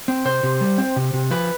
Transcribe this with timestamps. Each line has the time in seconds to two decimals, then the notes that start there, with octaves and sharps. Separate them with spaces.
0.08 C4
0.25 C3 C5
0.43 C3
0.61 G3
0.78 C4
0.96 C3
1.13 C3
1.31 F3 B4